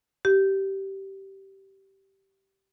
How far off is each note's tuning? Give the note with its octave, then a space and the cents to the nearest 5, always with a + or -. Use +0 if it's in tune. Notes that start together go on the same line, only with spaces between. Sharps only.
G4 -15